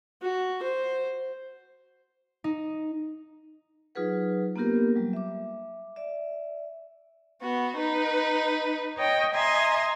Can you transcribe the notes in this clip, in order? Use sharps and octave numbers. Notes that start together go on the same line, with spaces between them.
F#4
C5
D#4
F#3 D#4 F4 G#4 B4 F#5
A#3 B3 D4 F4 G4 A#4
F#3 G3
E5 D6
D5 E5
B3 F#4
D#4 B4
C#5 D#5 G5
D#5 E5 G#5 A#5 C6